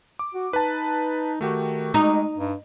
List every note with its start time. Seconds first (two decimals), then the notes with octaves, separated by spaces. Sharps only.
0.19 D6
0.34 F#4
0.53 D#4 B4 A5
1.41 D#3 A3 F#4 G4
1.94 G#3 D#4
2.38 G2